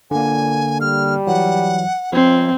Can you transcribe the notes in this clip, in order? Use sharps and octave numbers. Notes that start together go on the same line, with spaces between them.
A#2 D3 A#3 G#5
G3 F6
E3 F#3 F#5
C#2 F3 C4 G#6 C7